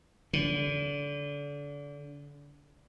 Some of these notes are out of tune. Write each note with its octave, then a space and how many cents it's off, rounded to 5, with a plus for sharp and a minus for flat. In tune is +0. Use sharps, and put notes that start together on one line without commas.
D3 -30